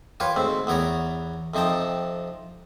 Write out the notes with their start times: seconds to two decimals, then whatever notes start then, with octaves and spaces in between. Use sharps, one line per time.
0.20 F4 G4 B4 C#5
0.36 D2 G#2 C4
0.67 E2 B3 C#5 D5 A#5
1.54 F2 C3 D#4 G5 A5